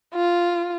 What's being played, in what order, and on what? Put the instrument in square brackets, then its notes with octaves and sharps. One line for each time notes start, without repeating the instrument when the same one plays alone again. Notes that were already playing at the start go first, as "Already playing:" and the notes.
[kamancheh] F4